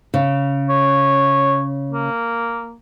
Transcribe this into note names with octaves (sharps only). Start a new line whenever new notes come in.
C#3
C#5
A#3